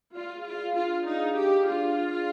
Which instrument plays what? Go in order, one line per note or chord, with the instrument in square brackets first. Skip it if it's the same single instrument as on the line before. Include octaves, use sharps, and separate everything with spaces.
[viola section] F4 [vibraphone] D5
[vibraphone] G#4
[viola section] F4
[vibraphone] F5
[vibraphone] D4 [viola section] F4
[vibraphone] D5
[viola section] D#4
[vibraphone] G#4
[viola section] G4 [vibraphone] F5
[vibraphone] D4
[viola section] F4
[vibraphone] D5
G#4